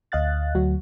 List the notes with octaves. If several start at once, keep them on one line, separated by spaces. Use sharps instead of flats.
D2 D#5 F5 F#6 A6
D2 F#3 F#4